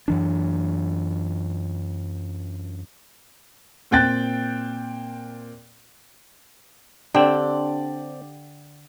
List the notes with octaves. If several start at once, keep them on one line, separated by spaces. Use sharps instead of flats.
F#2 E3 D4
A#2 C4 G5 F#6 A6
D3 C4 D4 G4 D5 G5